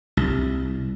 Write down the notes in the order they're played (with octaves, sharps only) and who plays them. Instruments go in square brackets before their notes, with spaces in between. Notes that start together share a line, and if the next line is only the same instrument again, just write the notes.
[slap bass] C2